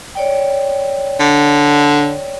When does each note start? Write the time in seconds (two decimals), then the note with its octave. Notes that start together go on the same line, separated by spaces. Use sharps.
0.15 C#5 D5 G5
1.20 D3